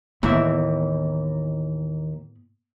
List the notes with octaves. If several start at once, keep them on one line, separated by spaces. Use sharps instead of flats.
D#2 A2 E3 B3 E5